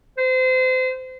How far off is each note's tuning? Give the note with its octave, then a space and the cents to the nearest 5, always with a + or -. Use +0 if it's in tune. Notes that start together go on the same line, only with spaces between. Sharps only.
C5 -30